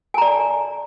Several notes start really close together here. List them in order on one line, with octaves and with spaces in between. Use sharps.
G#5 A#5 D5